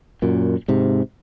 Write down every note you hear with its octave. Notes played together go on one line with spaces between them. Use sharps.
F#2 A#2
G#2 C3